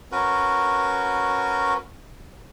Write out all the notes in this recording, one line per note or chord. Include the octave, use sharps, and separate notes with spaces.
C#4 F#4 A#4 B4